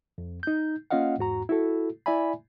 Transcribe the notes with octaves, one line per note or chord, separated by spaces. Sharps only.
F2
D#4 G6
A#3 C#4 F4 D#5 F5 F#5
E2 G#2 F#4 A#5
E4 F#4 A4
E4 D5 E5 G#5 B5